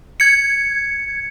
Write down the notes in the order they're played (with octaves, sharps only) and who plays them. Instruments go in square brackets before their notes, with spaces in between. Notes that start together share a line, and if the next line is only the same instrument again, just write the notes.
[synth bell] G#6 C#7